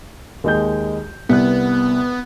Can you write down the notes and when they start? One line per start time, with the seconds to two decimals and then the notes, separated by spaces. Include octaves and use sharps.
0.44 D#2 G#3 G6
1.29 C2 B3 F#6